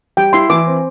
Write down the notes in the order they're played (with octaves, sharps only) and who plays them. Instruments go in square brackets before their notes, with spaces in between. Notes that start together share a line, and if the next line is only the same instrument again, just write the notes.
[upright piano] G3 [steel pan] G5
[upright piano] E4 [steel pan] C6
[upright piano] E3 [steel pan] D6
[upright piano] C4